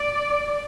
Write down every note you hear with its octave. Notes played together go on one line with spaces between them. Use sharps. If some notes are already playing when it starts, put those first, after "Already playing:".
Already playing: D5